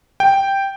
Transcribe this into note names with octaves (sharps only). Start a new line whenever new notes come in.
G5